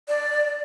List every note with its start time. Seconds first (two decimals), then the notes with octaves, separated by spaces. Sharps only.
0.08 D5